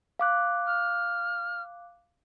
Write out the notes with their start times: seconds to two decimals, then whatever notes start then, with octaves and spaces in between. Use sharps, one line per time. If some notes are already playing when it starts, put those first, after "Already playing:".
0.19 F5 D6 F#6
0.67 F6